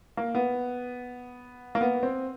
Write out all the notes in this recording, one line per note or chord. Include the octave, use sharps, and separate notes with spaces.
A#3
B3
A#3
B3
C4